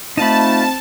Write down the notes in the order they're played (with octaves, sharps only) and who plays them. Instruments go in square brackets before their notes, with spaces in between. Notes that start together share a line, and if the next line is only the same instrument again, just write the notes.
[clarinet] A3 [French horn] C4 [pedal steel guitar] D#4 F4 B5 [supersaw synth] A5